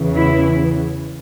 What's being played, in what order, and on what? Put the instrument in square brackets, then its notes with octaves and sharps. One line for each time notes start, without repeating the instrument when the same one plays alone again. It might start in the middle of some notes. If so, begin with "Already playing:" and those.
Already playing: [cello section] E2 C#3 E3
E4